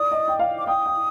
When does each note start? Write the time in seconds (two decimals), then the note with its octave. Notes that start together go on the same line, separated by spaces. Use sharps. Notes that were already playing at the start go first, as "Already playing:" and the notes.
Already playing: D5 D#6
0.11 D#5
0.28 G5
0.39 F5
0.58 D6
0.67 G5 D#6
0.86 G5